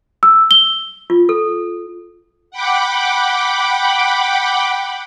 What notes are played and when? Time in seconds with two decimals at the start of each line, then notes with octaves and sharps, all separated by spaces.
0.23 E6
0.51 G7
1.10 F4
1.29 A4
2.51 F#5 G5 B5 D6